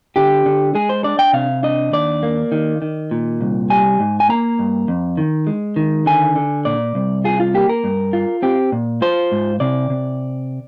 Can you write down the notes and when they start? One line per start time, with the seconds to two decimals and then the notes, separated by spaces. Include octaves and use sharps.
0.16 D3 G4
0.46 D3
0.75 G#3 G#4
0.89 C5
1.04 D4 D5
1.19 G5
1.33 C3 F5
1.63 D4 D#5
1.93 D#2 D5
2.23 A#3
2.52 D#3
2.82 D#3
3.11 A#2
3.41 C2
3.70 G3 G#5
4.00 G#2
4.20 G#5
4.29 A#3 A#5
4.59 G2
4.88 F2
5.17 D#3
5.47 G#3
5.76 D#3
6.06 D3 G#5
6.36 D3
6.65 A#2 D5
6.95 C2
7.24 F4 G#4
7.40 F4
7.54 A#3 G4
7.69 A#4
7.84 G2
8.13 F4
8.42 C4 G4
8.72 A#2
9.02 F4 C5
9.32 G#2
9.60 C3 D5
9.90 C3